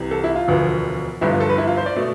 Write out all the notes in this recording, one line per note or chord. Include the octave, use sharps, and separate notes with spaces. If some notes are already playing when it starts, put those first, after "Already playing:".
Already playing: C2 C3 E3
A4
E4
F4
E1 D2 D3 F3 B3
G1 G2 D3 F3 B3 E4
F4
A4
B4
E4
F4
C5
D5
B2 A3